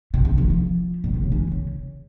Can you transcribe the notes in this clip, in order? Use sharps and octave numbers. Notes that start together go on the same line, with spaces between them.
C3
C#3
E3
F3
A#2
C3
C#3
E3
C#3